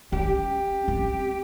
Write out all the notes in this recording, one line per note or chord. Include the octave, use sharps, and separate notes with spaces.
C#4 G4
C4